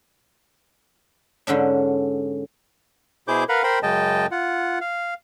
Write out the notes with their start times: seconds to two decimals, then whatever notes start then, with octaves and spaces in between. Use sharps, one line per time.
1.47 G#2 D3 C#4 D4
3.28 B2 E4 G#4 C5 D6 G6
3.49 A#4 B4 F5 F#5 B5
3.63 A#4 C5 G5 B5 C6
3.83 F#2 C#3 G#3 D#5 G5 A5
4.31 F4 F#5
4.81 F5